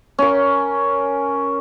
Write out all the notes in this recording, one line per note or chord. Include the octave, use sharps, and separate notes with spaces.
C#4 A#4